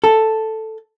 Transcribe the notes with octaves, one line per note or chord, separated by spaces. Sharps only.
A4